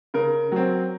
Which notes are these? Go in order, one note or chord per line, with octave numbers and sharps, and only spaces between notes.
C#3 A#4
F#3 C4